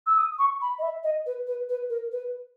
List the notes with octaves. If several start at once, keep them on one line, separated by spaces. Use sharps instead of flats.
E6
D#6
C#6
B5
D#5
E5
D#5
B4
B4
B4
A#4
B4